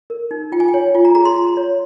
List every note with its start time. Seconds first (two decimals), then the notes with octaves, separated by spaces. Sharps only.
0.10 A#4
0.31 D#4
0.52 F4 G5
0.60 G#5
0.68 G5
0.74 C#5
0.94 F4 G#5
1.05 A#5
1.15 G#4 A#5
1.25 C6
1.37 F4
1.57 C#5